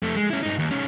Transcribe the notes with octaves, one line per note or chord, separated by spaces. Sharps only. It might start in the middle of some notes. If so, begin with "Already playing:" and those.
F2 A3
G#3
C#4 E4
G2 D#4
D#2
D#3 C#4